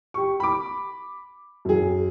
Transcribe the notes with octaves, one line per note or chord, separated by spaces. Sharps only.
G4 C#6
B5 D6
F#2 G#4